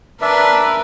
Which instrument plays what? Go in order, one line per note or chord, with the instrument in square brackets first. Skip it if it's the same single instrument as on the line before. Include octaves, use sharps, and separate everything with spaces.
[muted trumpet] D4 [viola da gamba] A#4 B4 [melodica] E5